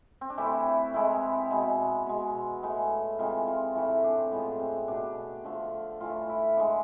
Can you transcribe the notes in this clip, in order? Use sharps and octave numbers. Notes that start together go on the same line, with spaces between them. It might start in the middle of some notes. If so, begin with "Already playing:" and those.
C4
D4
C3 E3 A3 E4
C3 G#3 E4
B2 G#3
B2 G#3
A2 G#3
C3 E3 G#3 F4
F4
A2 E3 A3 E4
E4
D4
C4
A2 F3 G#3 B3
C4
B2 A3 D4
D3 F3 A3
A2 E3 A3 F4
E4
D3 G#3